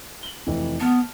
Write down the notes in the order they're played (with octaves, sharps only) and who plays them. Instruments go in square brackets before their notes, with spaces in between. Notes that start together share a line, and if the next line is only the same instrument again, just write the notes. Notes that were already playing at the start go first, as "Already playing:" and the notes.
[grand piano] F#7 G7
F1 E3
[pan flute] B3 [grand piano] A5 F6